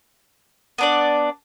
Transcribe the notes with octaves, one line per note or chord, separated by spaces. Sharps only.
B3 D4 D5